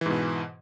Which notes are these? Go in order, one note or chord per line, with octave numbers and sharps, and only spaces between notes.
G#2 B2 E3